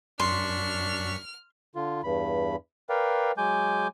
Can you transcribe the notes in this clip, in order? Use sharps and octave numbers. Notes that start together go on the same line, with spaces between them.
F#2 D4 C6 C#6 F6 B6
D3 F4
E2 G2 B5
A#4 B4 D5 F5 G5
F#3 G#3 G#5 D6 G6